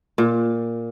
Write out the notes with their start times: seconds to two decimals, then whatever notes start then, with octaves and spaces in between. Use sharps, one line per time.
0.18 A#2